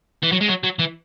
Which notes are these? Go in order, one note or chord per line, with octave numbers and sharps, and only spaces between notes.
E3
F#3
G#3
F#3
F#3
E3